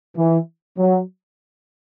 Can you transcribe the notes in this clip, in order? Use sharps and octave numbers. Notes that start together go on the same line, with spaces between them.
E3
F#3